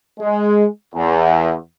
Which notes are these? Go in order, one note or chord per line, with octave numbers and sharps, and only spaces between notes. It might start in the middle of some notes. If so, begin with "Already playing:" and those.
G#3
E2